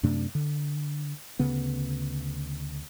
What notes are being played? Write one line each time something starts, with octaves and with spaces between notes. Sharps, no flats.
F#2 C3 A3 D4
D3
D2 C#3 B3